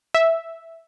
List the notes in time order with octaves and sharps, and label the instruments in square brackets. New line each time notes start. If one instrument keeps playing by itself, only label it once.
[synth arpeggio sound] E5